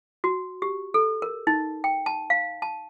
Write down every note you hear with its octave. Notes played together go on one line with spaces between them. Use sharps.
F#4
G4
A4
A#4
D#4
G5
A5
F5
A5